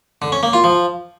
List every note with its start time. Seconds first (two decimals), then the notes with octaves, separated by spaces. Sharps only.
0.22 D3
0.32 C#4
0.43 A#3
0.53 F4
0.64 F3